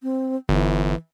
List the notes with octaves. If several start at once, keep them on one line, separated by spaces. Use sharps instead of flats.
C4
G1 E3